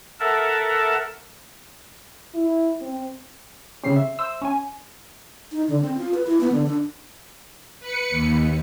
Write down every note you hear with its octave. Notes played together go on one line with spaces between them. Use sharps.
A4 A#4 E5 F#5 A5
E4
C4
C#3 C4 C#4 G4 C7
E5
C5 E6
C#4 G#5
D#4
D3
C4
F4
B4
E4
B3
D3
D4
B4 C#7
D#2